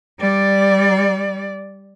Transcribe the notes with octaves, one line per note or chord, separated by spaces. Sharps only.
G3 D5